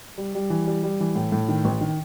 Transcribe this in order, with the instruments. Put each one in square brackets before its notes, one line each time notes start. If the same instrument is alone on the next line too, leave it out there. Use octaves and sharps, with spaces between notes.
[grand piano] G3
G3
E3
G3
G3
E3
A2
A2
D#3
A1
D#3